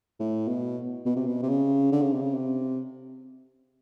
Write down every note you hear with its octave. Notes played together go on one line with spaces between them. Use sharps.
A2
B2
B2
C3
B2
C3
C#3
D3
C#3
C3
C#3
C3